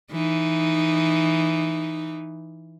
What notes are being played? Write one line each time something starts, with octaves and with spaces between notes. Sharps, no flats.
E3 D#4